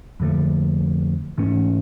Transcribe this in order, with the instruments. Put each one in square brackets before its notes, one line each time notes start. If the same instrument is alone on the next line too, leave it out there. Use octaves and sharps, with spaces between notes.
[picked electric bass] F2 D3 F3 A3
G#2 E3 A3 C#4